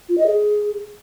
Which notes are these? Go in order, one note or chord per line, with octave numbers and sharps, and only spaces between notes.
F4
D#5
G#4